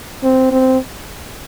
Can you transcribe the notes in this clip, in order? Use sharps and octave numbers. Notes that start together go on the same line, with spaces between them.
C4
C4